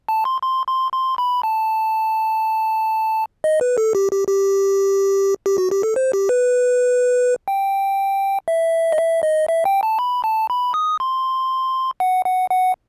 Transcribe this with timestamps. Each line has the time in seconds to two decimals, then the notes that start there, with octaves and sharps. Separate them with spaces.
0.08 A5
0.25 C6
0.42 C6
0.67 C6
0.93 C6
1.18 B5
1.43 A5
3.44 D#5
3.61 B4
3.78 A4
3.95 G4
4.12 G4
4.28 G4
5.46 G4
5.58 F#4
5.71 G4
5.83 A4
5.96 C5
6.13 G4
6.29 B4
7.48 G5
8.48 E5
8.92 D#5
8.98 E5
9.23 D#5
9.48 E5
9.65 G5
9.83 A5
9.99 B5
10.24 A5
10.50 B5
10.74 D#6
11.00 C6
12.00 F#5
12.26 F#5
12.50 F#5